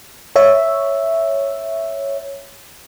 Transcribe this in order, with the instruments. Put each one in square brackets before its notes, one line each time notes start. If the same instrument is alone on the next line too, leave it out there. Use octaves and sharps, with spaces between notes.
[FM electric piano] C#5 E5